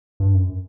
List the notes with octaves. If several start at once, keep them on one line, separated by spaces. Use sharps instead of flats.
G2
F#2